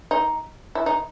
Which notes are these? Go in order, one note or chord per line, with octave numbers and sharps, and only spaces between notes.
D#4
E4
D#4